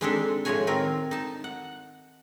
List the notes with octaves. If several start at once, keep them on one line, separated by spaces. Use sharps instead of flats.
G#3 C4 D4 D#4 G4 A4
A2 F3 G#3 F#4 C#5 G#5
D#3 C4 A#4
D#4 A5
F#5